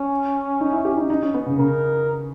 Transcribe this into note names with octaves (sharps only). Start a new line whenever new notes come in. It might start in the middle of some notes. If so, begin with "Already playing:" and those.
Already playing: C#4
D#4
E4
G4
D#4
D#4
C#4
B3
C#3
C#3 A#4